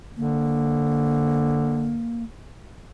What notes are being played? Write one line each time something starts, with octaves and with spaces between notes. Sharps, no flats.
D3 A#3